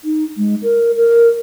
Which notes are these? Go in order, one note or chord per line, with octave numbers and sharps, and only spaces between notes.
D#4
G#3
A#4
A#4